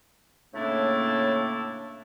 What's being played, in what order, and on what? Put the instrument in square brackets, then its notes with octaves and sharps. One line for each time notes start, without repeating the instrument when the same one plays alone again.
[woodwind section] A2 C#3 A3 A#3 D4 E4